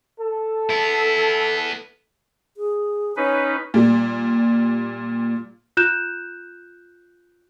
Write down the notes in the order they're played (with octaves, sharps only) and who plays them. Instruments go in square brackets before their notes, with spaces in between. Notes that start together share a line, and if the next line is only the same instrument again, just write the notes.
[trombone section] A4
[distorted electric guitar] B3 E4
[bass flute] G#4
[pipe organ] C#4 D#4 B4 [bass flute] C#5
[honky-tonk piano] A#2 G3
[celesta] F4 F#6 G6 E7